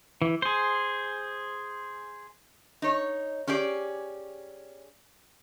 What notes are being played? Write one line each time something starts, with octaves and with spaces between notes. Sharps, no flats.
E3
G#4 C5
D#4 C#5
C#4 G4 G#4 D5